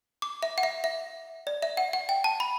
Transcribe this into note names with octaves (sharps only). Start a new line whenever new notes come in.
D6
E5
F#5
E5
E5
D5
E5
F#5
F#5
G5
A5
B5